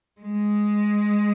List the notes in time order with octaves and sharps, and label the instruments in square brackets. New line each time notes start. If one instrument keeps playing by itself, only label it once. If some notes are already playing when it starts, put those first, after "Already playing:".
[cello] G#3